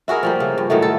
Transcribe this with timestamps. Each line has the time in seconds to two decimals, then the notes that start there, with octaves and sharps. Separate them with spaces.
0.08 E4 F#4 G#4 A#4
0.23 F3 G3 A#3
0.40 C#3
0.58 G2
0.70 A2 D#3 F#3 A3
0.82 A4